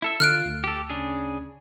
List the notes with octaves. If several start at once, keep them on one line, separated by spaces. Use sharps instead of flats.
E4 A4 E5
D3 F4 F6 F#6 D7
D2
G4 A4
C#3 D4 G#4